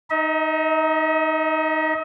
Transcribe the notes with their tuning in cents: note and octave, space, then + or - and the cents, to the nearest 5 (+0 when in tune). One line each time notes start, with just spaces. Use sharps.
D#4 +0 D#5 +45